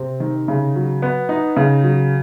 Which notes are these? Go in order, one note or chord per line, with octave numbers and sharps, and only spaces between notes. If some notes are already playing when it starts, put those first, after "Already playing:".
Already playing: C3 C4
D#3
C#3
F#3
B3
D#4
C#3
F#3